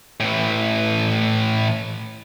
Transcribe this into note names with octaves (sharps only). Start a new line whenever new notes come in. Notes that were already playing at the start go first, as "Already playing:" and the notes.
A2 E3